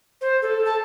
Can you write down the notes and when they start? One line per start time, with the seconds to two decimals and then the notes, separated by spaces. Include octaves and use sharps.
0.21 C5
0.42 A4
0.65 A5